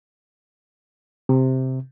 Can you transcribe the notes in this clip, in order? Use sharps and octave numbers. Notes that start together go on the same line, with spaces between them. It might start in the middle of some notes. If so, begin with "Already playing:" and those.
C3